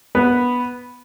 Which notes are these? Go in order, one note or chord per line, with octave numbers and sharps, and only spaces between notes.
B3 B4